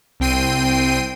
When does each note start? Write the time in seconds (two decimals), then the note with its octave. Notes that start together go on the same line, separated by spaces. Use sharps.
0.20 C2 C4 G5 C7 D#7